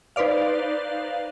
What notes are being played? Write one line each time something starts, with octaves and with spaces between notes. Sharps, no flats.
D#4 B4 C5 D5 F5